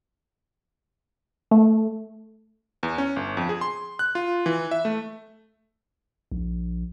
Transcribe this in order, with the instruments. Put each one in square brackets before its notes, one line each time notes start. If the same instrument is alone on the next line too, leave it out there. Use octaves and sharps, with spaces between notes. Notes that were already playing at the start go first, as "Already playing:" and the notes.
[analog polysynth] A3
[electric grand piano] E2
C#4
G1
F2
G#4
C6
F#6
F4
E3
E5
A3
[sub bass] A#1